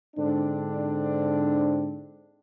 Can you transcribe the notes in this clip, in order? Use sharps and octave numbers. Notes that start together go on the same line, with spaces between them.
G#2 D3 C4 D4